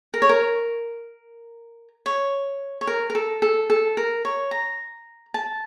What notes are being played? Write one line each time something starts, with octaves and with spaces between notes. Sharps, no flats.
A#4
C#5
A#4
C#5
C#5
A#4
A#4
A4
A4
A4
A#4
C#5
A#5
A5